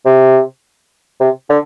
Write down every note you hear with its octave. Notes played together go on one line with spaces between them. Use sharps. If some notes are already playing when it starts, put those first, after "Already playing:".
C3
C3
D3